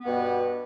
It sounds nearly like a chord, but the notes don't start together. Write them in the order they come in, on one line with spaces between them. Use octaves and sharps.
B3 G2 B2